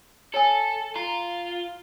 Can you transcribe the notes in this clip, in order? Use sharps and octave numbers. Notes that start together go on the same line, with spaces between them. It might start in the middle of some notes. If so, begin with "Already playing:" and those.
A4 C#5 G#5
F4 A#5